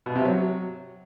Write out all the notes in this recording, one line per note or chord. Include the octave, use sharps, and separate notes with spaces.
B2
C3
F#3